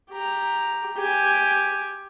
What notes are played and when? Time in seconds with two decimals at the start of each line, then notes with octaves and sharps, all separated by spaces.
0.11 G4 A#5
0.97 G4 G#5